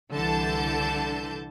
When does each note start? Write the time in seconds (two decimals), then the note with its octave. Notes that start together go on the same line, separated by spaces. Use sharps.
0.12 C2 D3 E3 A5 G6